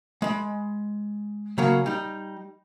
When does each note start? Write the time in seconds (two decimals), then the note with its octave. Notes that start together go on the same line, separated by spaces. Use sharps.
0.22 G#3 B5
1.58 C#3 F#3 A#3
1.86 G3 D#4